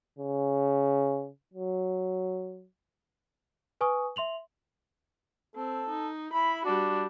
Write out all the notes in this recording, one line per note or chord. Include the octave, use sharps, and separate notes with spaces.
C#3
F#3
B4 G#5 C#6 D#6
E5 C6 F7 F#7
C4 A4
D#4
E4 B5
G3 D4 F#4